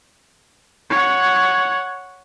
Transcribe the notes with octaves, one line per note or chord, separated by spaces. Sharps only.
C#5 F#5